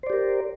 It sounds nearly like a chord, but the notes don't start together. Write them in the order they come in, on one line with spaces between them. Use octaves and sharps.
C5 D5 G4 A#4